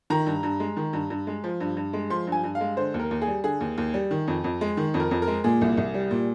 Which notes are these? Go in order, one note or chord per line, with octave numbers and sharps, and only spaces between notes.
D#3 A#5
G2
G2
G#3
D#3
G2
G2
G#3
F3
G2
G2
G#3
F3 C6
G2 G#5
G2
F5
G#3
D3 C5
D#2
A#4
D#2
G#4
G3
D3 G#4
D#2
D#2
G3
D#3
F2
F2
G#3
D#3
F2
A#4
F2
A#4
G#3
A#2 G#4
C2
C2
G3
A#2